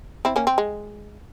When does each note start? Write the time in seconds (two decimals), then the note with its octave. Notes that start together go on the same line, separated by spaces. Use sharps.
0.25 C4 E4
0.36 A#3 C#4
0.47 C4
0.58 G#3